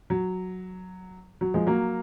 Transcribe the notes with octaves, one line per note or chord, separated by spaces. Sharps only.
F#3
F#3
F3 G#3
F#3 A#3